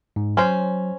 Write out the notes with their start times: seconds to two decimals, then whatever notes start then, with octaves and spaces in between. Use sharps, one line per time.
0.16 G#2
0.37 F#3 C#4 C5